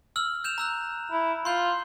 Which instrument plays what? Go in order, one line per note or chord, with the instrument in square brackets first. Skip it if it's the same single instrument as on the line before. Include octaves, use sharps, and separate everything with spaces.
[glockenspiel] E6 F6 F#7
G6 E7 F7
A#5 E6 F#6
[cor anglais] E4
[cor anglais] F4 [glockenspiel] C6 G6